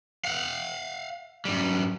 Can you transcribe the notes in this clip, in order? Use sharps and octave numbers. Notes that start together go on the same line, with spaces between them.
F5 F#5
F#2 G3